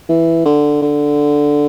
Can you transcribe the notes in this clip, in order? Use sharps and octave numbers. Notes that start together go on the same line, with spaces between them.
E3
D3
D3